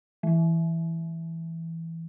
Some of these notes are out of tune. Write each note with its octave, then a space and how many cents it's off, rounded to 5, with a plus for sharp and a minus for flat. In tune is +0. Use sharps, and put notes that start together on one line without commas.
E3 +0 G#3 +45